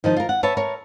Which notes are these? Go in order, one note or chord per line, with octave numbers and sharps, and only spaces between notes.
D#3 F3 D#4
F4 A#4
F#5
B4 C#5 E5 A5
A#4 C#5